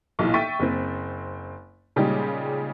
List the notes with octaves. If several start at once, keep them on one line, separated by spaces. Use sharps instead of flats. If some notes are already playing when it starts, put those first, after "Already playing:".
B1 A#2 E3
E5 G5 C#6 A6 B6 D#7
F#1 C4
A#2 C#3 G3 G#3 D#4 G4